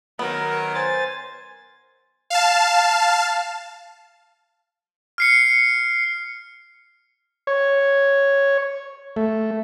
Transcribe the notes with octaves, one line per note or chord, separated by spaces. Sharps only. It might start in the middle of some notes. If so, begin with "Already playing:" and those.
D#3 F#3 B3 A#4
C5 G#5 A6
F5 A5
F6 C7 C#7
C#5
A3